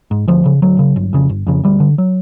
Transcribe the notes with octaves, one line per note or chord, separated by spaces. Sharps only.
G#2
D2 F3
C#3
D2 F#3
C#3
G1
F2 C#3
G1
F2 C#3
D2 G3
D3
F#3